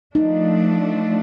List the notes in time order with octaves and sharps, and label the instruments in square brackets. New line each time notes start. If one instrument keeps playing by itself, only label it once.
[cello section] F3 A3 D4 [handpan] D#4